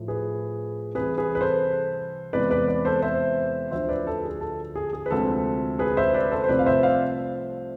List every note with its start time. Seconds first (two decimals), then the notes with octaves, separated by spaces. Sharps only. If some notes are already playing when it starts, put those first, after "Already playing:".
Already playing: A2 F3 A3
0.08 G#4 B4
0.95 C2 C3 E3 G#4 B4
1.18 G#4 B4
1.35 B4
1.41 A4 C5
2.33 E2 C3 E3 G#3 B3 B4 D5
2.50 B4 D5
2.68 B4 D5
2.85 A4 C5
3.02 C5 E5
3.71 D2 D3 F3 C5 E5
3.89 B4 D5
4.07 A4
4.24 G#4
4.41 A4
4.76 G#4
4.93 G#4
5.06 B4
5.10 D2 C3 F3 G#3 C4 A4
5.79 G#4 B4
5.97 C5 E5
6.14 B4 D5
6.31 A4 C5
6.44 C5
6.48 C2 C3 F3 A3 C4 B4 D5
6.59 F5
6.66 C5 E5
6.83 D5 F5